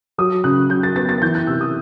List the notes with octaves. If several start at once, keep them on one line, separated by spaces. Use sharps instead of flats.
F#3 D#6
C#3 F#6
F#3 G6
A6
B3 A6
A6
E3 G6
F#6
C3 E6
D#6